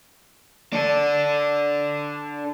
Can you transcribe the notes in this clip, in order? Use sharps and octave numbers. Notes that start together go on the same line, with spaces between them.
D4 A4